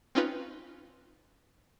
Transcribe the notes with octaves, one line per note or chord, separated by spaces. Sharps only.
C4 C#4 D#4 F4 B4